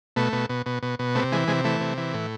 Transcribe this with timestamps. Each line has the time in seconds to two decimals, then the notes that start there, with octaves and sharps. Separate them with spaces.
0.16 B2 A3
0.33 B2
0.49 B2
0.66 B2
0.83 B2
0.99 B2
1.15 C3 A3
1.32 E3 G#3
1.48 C3 G#3
1.64 E3 A3
1.81 C3
1.97 E3
2.14 A2